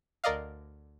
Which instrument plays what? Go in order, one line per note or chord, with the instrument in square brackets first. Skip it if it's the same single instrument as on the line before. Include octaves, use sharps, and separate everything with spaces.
[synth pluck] D2 A#4 D5 D#5 F5